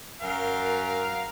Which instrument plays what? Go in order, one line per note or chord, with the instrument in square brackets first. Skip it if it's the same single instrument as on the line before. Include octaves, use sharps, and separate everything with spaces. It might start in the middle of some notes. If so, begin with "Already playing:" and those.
[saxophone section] F#2 [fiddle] A#4 [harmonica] F5